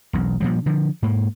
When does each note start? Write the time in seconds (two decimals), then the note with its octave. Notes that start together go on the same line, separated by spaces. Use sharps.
0.13 E1 B1
0.40 A#2 F3 G3
0.66 D3 F3
1.02 G#2 A#3